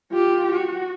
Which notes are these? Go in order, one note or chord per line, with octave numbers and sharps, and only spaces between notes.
F4 G4
F#4